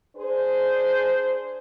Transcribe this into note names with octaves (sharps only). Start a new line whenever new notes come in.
D4 G#4 C5